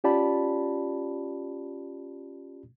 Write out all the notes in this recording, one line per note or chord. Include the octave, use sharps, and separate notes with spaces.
C#4 F4 G4 D5 A5 B5